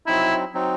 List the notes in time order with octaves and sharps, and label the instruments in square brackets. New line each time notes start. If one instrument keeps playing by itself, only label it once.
[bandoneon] F#3 C4 D#4 [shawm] E4
[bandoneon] F#3 C4 D#4